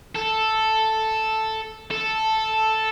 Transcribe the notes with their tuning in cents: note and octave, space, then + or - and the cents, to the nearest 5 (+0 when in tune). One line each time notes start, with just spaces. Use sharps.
A4 +0
A4 +0